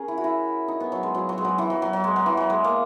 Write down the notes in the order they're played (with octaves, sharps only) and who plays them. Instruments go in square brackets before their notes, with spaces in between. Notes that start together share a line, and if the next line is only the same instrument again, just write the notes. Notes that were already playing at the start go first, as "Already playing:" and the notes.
Already playing: [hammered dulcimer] C#4 G#4 A#4
E4
F#4
E4
D#4
B3
F#3
G#3
F#3
F#3
G#3
F#3
E3
F#3
F#3
F#3
G#3
F#3
E3
F#3
G#3
A#3